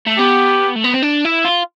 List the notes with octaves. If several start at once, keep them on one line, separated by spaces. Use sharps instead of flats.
A3
B3 G4
A3
B3
C4
D4
E4
F4